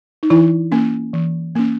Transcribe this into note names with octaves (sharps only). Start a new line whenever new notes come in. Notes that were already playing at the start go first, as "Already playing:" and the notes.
D#4
E3 E4
A#3 C#4
E3
A#3 C#4